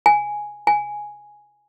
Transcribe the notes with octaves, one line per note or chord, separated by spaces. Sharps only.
G#5
G#5